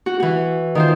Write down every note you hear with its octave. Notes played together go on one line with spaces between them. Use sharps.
F#4
E3 F#4
D#3 F4 C5